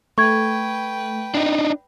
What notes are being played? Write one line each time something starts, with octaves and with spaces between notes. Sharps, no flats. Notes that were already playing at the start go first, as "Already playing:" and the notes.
A3 B4 G5 C#6 G#6
D4 D#4